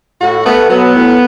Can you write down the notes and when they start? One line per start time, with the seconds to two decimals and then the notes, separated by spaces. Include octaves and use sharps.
0.21 A2 F#4
0.45 A3 B3
0.69 F#3 B3
0.94 A2